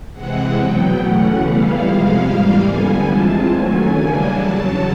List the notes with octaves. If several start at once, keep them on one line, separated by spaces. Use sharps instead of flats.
C3 E3 G#3 C4 F#5
E2 B2 F#3 B3 G5
F#2 C#3 E3 A3 C#4 F#5
E3 G3 B3 E4 F5
F2 C3 F3 G#3 F5
G#2 E3 G3 A#3
F2 D3 G3 B3 G#5
E3 G#3 C4 F4 A5
F#2 D#3 F#3 A3 C#4 G#5
C#3 E3 G3 A#3 D4
E2 C#3 F#3 A5